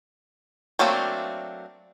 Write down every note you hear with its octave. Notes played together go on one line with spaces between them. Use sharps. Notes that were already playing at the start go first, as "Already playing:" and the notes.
F#3 A3 A#3 C4 D4